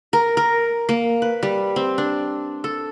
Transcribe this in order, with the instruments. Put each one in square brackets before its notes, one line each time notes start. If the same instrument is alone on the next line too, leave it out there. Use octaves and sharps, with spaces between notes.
[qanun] A#4
A#4
A#3
B4
G3
C4
D4
A4